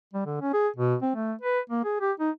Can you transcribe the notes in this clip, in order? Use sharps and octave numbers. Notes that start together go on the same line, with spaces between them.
G3
D3
C#4
G#4
B2
C4
A3
B4
A#3
G#4
G4
D#4